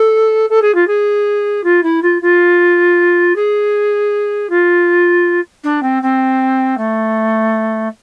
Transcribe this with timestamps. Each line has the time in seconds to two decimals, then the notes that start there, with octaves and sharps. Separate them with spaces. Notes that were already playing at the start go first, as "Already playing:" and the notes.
Already playing: A4
0.49 A4
0.61 G#4
0.74 F4
0.87 G#4
1.63 F4
1.83 E4
2.02 F4
2.22 F4
3.35 G#4
4.49 F4
5.63 D4
5.82 C4
6.02 C4
6.77 A3